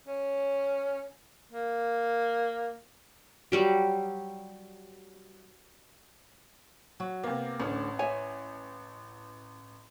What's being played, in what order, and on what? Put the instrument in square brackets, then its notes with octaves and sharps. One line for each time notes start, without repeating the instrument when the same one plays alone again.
[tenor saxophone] C#4
A#3
[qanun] F#3 G3 G4
[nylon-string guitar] F#3
[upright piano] C3 A#3 [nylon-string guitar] B3
[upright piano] A1 [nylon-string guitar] D2 D3 [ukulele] C#4
[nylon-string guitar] C#5 E5 [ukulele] G#5